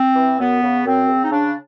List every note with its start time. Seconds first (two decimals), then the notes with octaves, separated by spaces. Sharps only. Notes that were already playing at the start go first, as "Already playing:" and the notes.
Already playing: C4
0.16 E3
0.39 F#2 B3
0.62 C#3
0.86 F#2 C4
1.09 C#3
1.22 D#4
1.32 C#3 D4